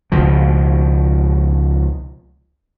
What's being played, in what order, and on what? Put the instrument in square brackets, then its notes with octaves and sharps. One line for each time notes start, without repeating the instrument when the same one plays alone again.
[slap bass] C#2 B2 F3